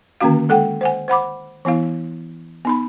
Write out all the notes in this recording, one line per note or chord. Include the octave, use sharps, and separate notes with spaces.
D3 D#3 A#3 C#4 F#4 F5
G#3 A4 F#5 G5
C5 F#5 G#5
C5 F#5 B5 D6
E3 B3 E4 F5
B3 D#4 B5